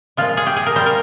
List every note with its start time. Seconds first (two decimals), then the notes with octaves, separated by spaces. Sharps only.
0.17 A#2 F3 G#3 F4
0.37 G#4
0.46 G4
0.56 G#4
0.66 A#4
0.76 A#2 G3 C5
0.86 A#4